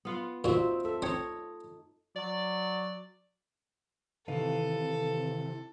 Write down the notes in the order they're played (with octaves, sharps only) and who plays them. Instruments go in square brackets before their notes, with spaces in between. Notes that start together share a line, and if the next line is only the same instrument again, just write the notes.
[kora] B3 F4 F#5
[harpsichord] A#2 F#4 [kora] C4 E5 [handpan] D#4 F4
[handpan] A4 [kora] E5
[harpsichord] C4 [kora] D#4 C#5
[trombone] F#3 [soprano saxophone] D5
[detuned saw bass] C3 [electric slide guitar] D#3 B4 F5 [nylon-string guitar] E3 D#4 [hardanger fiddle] A4